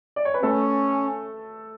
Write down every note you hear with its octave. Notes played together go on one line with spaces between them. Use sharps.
D5
C#5
B4
A3 C#4 A4